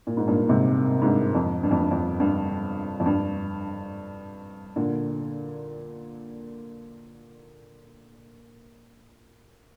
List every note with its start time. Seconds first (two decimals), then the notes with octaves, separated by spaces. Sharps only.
0.07 A#2
0.17 G#2
0.27 G2 A#2
0.49 G#2 C3
1.02 G#2
1.06 G2
1.35 F2
1.63 G2
1.71 F2
1.79 G2
1.91 F2
2.20 G2
3.00 F2
3.06 G2
4.76 A#2 D3